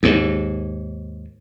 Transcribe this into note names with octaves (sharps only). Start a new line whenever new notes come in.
D#2 G#2